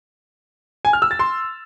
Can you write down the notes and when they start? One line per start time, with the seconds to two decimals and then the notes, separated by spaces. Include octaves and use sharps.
0.85 G#5
0.93 F6
1.02 E6
1.11 A6
1.19 C6